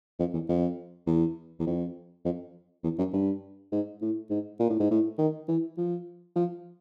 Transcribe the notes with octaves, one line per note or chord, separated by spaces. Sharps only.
F2
E2
F2
E2
E2
F2
F2
E2
F#2
G2
G#2
A2
G#2
A#2
A2
G#2
A2
D#3
E3
F3
F3